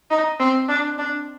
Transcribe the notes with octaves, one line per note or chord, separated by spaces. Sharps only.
D#4
C4
D4
D4